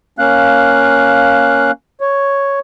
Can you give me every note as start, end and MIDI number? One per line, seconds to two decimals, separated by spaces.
0.19 1.71 58
0.19 1.71 61
0.19 1.71 77
0.19 1.71 90
2.01 2.59 73